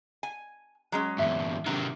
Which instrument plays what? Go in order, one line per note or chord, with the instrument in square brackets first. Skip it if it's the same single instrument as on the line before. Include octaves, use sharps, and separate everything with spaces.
[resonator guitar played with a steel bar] G#5
F#3 G#3 C#4
[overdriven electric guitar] E2 G2 [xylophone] E5
[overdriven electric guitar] C3 D#3 [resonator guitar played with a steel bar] F#3